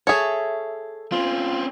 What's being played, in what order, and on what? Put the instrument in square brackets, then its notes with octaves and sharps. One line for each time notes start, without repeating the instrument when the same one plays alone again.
[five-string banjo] G#4 C#5 [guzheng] A4 E5
[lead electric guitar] C4 C#4 [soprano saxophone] F4